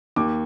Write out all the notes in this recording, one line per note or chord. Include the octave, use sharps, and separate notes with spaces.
D#2 D6